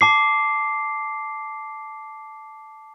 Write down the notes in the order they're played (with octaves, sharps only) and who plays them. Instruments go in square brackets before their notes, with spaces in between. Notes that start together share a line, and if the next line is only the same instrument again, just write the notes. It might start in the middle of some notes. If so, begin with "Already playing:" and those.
[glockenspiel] A5 D6 C7